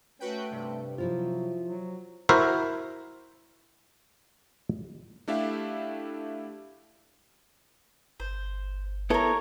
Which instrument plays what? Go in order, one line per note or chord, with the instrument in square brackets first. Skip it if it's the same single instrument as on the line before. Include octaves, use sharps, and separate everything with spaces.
[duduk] A3 [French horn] C#4 [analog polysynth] F#4 B4 G5
[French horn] G2 [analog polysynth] C3
[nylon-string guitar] F3 E4 F4 [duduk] F#3 [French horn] C5
[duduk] F#3
[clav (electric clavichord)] E4 F#4 A#4 C5 E5
[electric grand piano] A3 D4 E4 G4 E5 F5
[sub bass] G1 [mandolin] C5
[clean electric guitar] B3 E4 A4 [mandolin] A#4 C#5